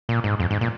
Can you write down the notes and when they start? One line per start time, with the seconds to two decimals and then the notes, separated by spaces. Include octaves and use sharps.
0.09 A#2
0.24 G#2
0.40 F2
0.51 G#2
0.61 A#2